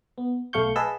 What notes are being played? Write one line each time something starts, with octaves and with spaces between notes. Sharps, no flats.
B3
B1 A3 F5 C#6 G6
G#4 B4 D#5 F5 A5 E6